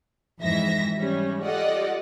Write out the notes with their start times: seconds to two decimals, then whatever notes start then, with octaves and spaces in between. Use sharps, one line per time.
0.40 F2 G#2 E3 E5 A#6
0.99 G3 C#4
1.44 F4 G4 A4 D5 D#5 F#5